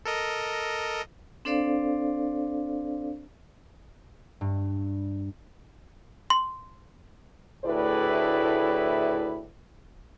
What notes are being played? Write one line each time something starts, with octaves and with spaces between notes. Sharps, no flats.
A4 A#4 D#5
C4 D4 A4 C5 D5 F5
G2
C6
D2 A2 E4 G#4 B4 D5